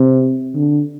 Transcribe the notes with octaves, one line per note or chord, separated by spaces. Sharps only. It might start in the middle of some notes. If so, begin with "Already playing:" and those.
Already playing: C3
D3